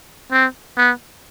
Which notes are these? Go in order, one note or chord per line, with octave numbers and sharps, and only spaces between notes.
C4
B3